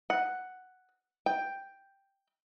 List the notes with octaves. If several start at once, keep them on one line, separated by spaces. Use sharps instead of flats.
F#5
G5